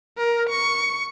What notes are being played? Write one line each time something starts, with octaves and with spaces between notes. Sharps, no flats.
A#4
C#6